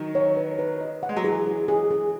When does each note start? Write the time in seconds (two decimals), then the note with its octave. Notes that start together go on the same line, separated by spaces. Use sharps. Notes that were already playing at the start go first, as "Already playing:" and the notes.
Already playing: D#3 F#3
0.15 C#5
0.37 B4
0.59 B4
0.81 D#5
1.03 F#5
1.09 G#3
1.17 F#3
1.24 E3 G#4
1.46 G#4
1.68 G#4
1.91 G#4